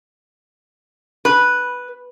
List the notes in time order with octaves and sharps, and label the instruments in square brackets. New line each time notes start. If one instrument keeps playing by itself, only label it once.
[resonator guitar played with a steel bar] B4